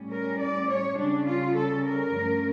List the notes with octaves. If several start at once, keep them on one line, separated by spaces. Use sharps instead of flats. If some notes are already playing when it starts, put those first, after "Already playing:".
Already playing: A2 G3 C#4
A#4
D5
C#5
C#3 G3 C#4 D4
F4
A4
A#4
G2 F3 A3 C#4